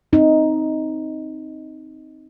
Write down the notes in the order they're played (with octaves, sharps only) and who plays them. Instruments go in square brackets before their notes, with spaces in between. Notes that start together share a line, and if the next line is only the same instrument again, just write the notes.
[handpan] C4 D#4